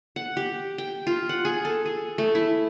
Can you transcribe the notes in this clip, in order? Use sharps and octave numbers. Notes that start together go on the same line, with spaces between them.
F#5
G4
G5
F4
F#5
G#4
A4
G#4
A3
E4